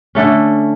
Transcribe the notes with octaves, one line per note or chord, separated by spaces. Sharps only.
D3 A3 C#4